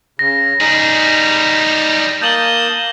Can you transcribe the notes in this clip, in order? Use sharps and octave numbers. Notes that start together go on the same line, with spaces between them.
C#3 A#6
G3 D#4 G#4
A#3 A5 D#6 G6 F#7 G7